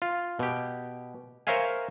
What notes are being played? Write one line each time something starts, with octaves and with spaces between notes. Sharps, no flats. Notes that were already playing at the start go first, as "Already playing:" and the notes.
F4
B2 G4
A#4 C5 C#5 E5 F5 G#5